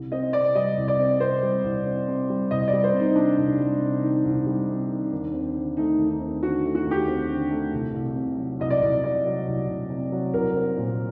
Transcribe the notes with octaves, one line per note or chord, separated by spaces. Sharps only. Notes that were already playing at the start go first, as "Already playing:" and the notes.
Already playing: C2
C4 D#5
C3 D5
G3 D#5
C2
D5
C4
C3 C5
G3
C2
C4
C3
G3
C2 D#5
D5
G3
C5
C3
D#4
D#3 D4
C2
G3
C3
D#3
C2
G3
C3
D#3
D#2
C4
D3
A3 D#4
D#2
D#4
C4
D3 F#4
A3
F#4
D#2
G4
C4
D3
A3
C2
C2
C3
F#3
C2 D#5
D5
C2
C3 D5
F#3
C2
C2
C3
F#3
C2 A#4
C4
A#2